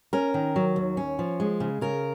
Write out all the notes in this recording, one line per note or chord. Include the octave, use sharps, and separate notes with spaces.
C#4 A#4
D#3
F#3
D#2
C#4
F3
G#3
C#3
C#3 A#4